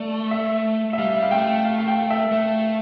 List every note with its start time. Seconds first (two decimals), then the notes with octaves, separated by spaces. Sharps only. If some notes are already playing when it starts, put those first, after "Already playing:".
Already playing: A3 D5
0.31 E5
0.93 E5
0.98 G3 F5
1.23 F5
1.31 A3 G5
1.65 F5
1.78 F5
1.88 G5
2.10 E5
2.32 A3